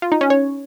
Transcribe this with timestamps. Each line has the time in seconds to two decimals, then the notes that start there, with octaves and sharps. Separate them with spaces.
0.02 F4
0.12 D#4
0.21 C#4
0.30 C#5